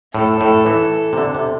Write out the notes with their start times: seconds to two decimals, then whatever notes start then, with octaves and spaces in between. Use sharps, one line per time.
0.14 A2 A4
0.41 A2
0.66 E3
1.13 C3
1.18 D3
1.35 C3